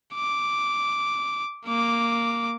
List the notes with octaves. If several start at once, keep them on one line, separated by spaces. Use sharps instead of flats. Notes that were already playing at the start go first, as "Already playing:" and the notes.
D6
A#3 D6